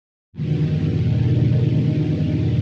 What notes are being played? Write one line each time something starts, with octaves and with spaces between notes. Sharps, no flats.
F2 G#2 B2 D3 D#3